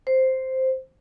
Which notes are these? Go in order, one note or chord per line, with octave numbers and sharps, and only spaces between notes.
C5